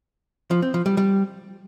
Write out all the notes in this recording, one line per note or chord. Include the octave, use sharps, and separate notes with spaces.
F3
C4
F3
G3
G3